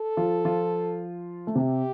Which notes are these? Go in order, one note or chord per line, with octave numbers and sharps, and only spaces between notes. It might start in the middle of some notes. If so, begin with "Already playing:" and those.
Already playing: A4
F3 F4
F3 F4
A3
C3 C4 G4